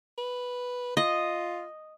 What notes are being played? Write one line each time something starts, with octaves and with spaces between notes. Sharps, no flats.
B4
F4 D#5